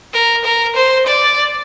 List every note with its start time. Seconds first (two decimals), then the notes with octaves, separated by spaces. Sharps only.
0.13 A#4
0.44 A#4
0.76 C5
1.07 D5